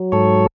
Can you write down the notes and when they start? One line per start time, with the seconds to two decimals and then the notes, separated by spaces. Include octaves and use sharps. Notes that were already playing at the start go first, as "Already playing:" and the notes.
Already playing: F#3
0.12 G#2 A4 C#5